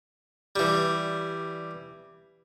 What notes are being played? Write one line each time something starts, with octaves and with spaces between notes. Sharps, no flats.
E3 G3